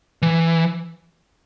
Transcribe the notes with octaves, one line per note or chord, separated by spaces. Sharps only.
E3